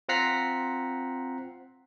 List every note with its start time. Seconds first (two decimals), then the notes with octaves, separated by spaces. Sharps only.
0.09 C4 F4 F#5 A#5 B6 C7